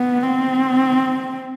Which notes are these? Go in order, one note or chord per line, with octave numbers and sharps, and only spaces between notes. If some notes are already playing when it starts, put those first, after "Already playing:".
Already playing: B3
C4